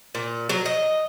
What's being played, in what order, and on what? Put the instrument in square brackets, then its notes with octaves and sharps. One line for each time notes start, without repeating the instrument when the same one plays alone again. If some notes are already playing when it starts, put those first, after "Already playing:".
[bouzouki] A#2
F#3
D#5